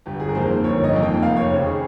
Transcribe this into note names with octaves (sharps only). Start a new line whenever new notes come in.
G1 G4
G#4
A#4
F2 D#3 A#3 C5
C5
G1 C#5
D#5
F2 D#3 A#3
G5
F1 F5
C#5
D#2 C#3 C5
G#4